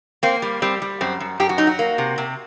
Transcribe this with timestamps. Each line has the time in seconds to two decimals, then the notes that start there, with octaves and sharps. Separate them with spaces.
0.23 A#3 C4
0.42 G3
0.62 G3 C4
0.82 G3
1.01 F#2 C4
1.20 F#2
1.40 F#2 G4
1.49 F#4
1.58 F#3 D#4
1.67 F#4
1.79 A#3
1.98 C3
2.18 C3